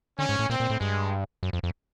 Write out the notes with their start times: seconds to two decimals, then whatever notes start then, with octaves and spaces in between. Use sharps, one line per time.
0.19 D3 C#4
0.29 G#2
0.39 A2
0.50 A#2 C4
0.60 A#2
0.70 A2
0.80 G2 G#3
1.43 F#2
1.53 F2
1.63 F2